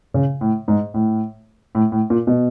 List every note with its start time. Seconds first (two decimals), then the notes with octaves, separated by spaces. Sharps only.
0.14 C#3
0.41 A2
0.68 G#2
0.94 A2
1.75 A2
1.92 A2
2.10 A#2
2.27 B2